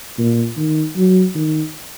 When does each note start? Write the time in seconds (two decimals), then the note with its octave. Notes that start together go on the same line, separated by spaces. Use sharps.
0.18 A#2
0.57 D#3
0.96 F#3
1.35 D#3